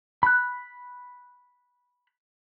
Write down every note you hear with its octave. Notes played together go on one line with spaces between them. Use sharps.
B5 F#6